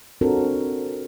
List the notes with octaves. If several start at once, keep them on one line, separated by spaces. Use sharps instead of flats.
C4 D4 F4 F#4 A4 A#4